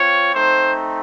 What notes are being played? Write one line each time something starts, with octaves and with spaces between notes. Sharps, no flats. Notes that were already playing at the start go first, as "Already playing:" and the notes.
Already playing: C4 F4 C#5
A3 C4 D#4 C5